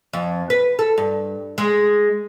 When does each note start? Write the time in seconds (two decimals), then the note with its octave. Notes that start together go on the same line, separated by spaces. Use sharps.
0.13 F2
0.50 B4
0.79 A4
0.98 G2
1.58 G#3